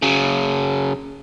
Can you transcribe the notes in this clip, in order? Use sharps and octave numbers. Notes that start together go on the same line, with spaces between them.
C#3 F#3